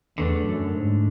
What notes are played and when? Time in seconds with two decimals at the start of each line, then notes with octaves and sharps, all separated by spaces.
0.18 E2 D3 A3 D4
0.46 F#2
0.75 G#2